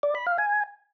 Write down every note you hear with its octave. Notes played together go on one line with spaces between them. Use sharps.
D5
B5
F5
G#5